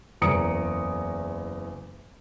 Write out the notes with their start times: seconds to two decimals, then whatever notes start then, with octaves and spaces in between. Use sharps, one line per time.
0.21 F#1 E2 A#5 D#6 C#7 D7